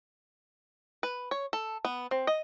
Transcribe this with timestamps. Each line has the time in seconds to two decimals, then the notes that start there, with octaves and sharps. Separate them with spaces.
1.03 B4
1.31 C#5
1.53 A4
1.85 B3
2.11 C4
2.27 D#5